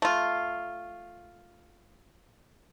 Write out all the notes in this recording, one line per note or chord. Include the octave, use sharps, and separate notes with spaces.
A3 F4